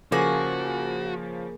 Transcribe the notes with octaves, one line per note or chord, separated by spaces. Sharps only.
C#3 F3 A#3 F#4 G#4 G#5